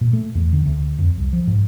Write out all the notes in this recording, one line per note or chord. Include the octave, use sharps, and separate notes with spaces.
A#2
A3
E2
D3
D2
F2
C2
F3
G#2